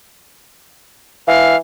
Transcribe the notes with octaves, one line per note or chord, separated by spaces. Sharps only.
E3 F5